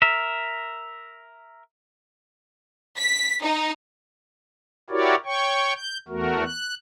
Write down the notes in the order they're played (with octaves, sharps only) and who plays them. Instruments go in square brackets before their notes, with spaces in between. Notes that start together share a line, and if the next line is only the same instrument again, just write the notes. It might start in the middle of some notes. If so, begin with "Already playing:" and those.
[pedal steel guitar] A#4 E5
[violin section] B6
D#4
[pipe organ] E4 F#4 G4 A#4 C#5 D5
C#5 G5 C#6
G6
E2 A3 F#4 A#4
F#6